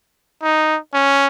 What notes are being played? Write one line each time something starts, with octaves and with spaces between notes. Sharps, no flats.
D#4
C#4